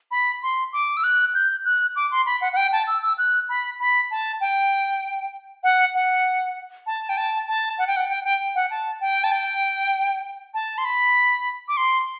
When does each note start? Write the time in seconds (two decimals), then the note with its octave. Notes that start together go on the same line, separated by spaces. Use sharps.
0.11 B5
0.43 C6
0.73 D6
0.97 E6
1.04 F#6
1.35 G6
1.65 F#6
1.96 D6
2.11 C6
2.26 B5
2.41 F#5
2.53 F#5
2.57 G5
2.72 A5
2.87 E6
3.02 E6
3.18 F#6
3.49 B5
3.80 B5
4.11 A5
4.41 G5
5.64 F#5
5.94 F#5
6.87 A5
7.09 G5
7.17 A5
7.48 A5
7.79 F#5
7.87 G5
7.96 F#5
8.09 G5
8.24 G5
8.55 F#5
8.70 A5
9.01 G5
9.24 A5
9.32 G5
10.54 A5
10.78 C6
10.85 B5
11.68 D6
11.77 C6